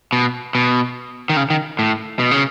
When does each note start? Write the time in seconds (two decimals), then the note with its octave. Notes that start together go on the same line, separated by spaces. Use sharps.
0.13 B2
0.55 B2
1.29 D#3
1.37 C#3
1.50 D#3
1.79 A2
2.19 B2
2.31 C#3